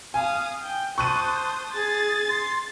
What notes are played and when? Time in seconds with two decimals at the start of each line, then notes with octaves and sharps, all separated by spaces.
0.14 F5 G#5 D#6
0.63 G5
0.98 C5 A5 C#6 D#6 F#6 D#7
1.73 G#4 A6
2.29 C6